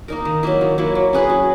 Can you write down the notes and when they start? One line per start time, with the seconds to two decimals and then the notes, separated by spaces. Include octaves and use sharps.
0.08 A#3 D#4 A#4
0.25 D#3
0.43 F#3 A#3 E4
0.61 D#3
0.78 F#3 A#3 E4
0.95 F#3
1.13 C#4 G#4 B4
1.30 F#3